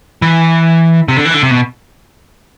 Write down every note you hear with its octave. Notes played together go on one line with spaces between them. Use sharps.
E3
C3
D3
E3
D3
C3
B2